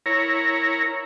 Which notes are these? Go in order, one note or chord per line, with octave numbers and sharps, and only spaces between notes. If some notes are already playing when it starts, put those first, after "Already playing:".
E4 A#4 C#5 A#5